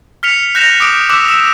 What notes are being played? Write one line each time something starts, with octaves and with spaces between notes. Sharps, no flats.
F6 B6 C#7 F7
F#6 G6 A#6 B6 E7 F7
D6 D#6 D7
D6 E6 F#6 B6 E7
E6 E7